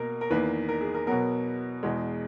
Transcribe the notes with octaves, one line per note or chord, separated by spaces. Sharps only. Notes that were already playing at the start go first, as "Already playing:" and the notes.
Already playing: B2 A#3 A#4
A#4
E2 D#3 A#3 B4
A#4
G#4
A#4
B2 F#3 B3 A#4
E2 B2 G#3